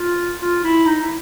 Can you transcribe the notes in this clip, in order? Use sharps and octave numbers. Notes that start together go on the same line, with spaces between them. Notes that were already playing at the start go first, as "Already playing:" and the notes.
Already playing: F4
F4
E4
D#4
E4